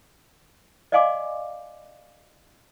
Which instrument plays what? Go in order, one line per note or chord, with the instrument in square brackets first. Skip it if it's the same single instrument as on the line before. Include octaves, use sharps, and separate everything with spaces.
[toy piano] D5 D#5 F5 G#5 C6 D6